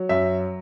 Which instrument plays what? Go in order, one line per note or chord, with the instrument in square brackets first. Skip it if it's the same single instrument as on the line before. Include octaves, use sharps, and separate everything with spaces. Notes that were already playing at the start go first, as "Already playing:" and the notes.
Already playing: [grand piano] F#3
F#2 E5